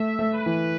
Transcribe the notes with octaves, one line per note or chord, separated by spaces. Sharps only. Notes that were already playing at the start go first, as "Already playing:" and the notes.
Already playing: A3 E5
A3
B4
E3